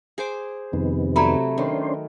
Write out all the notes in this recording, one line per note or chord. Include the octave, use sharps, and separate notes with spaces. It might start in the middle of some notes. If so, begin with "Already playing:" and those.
G#4 C5 D6
F2 C3 D#3 B3
F#3 A3 D5 A#5 B5
D#3 C#4 D4 F#4 C5